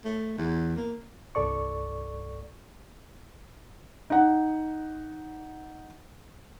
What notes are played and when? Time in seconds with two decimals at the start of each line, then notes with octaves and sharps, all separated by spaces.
0.05 A3
0.38 E2
0.76 A#3
1.35 C2 G2 A4 D5 C#6
4.10 D#4 F#5